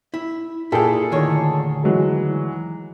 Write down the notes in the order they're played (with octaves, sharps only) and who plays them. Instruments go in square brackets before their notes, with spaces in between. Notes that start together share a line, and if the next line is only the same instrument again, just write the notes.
[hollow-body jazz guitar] E4
[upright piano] A#2 G#4 A4 [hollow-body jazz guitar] E4 G5
[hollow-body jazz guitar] D2 D#3 C#5
[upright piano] E3 F#3 G#3